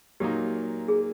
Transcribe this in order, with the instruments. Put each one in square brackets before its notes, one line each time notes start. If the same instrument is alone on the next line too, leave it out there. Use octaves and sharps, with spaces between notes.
[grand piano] A#2 F#3 A#3 D#4 [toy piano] G4
[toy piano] G#4